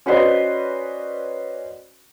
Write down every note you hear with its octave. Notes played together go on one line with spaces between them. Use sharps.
C#4 F#4 B4 C5 D5 D#5